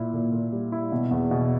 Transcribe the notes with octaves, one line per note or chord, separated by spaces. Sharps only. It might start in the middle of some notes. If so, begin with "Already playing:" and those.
Already playing: A#2 E4
A#2
A#2
G3
E4
B2
E2
B2